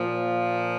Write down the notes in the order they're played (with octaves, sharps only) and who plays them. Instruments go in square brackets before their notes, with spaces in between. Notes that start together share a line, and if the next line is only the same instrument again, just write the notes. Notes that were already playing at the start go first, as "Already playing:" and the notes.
Already playing: [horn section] A#2 F3